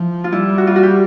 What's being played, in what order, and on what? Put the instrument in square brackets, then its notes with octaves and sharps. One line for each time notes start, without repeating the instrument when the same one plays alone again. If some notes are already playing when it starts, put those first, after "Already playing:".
Already playing: [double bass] F3 [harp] E4
[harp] F4
[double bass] G3 [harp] E4
[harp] F#4
F4
F#4
G4